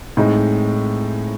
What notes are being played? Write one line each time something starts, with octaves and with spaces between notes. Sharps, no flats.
A2 G#3 C4 D#4